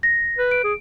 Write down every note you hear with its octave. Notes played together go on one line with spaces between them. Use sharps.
A#6
B4
D7
G#4